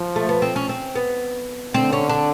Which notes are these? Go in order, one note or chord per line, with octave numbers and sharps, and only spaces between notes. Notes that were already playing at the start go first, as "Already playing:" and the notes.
Already playing: F3
A3
B3
C4
C#4
C4
B3
D3 C4
C#4
D4